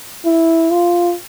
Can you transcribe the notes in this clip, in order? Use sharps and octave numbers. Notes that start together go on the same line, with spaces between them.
E4
F4